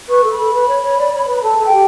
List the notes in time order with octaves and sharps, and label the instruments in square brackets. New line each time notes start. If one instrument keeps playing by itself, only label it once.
[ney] B4 [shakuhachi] C#6
[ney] A4
[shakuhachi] B5
[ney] A4
B4
C#5
C#5
D5
C#5
B4
[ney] A4 [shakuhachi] A5
[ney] A4
[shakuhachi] G5
[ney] G4